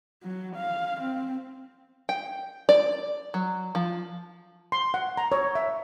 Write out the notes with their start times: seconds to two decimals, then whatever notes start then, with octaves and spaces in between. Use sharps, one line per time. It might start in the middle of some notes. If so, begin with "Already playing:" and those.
0.23 F#3
0.56 F5
1.01 C4
2.09 G5
2.69 D5
3.34 F#3
3.75 F3
4.72 C6
4.94 F#5
5.17 A#5
5.32 C#5
5.55 E5